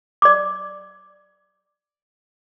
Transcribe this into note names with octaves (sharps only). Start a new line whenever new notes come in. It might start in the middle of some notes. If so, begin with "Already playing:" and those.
D5 D6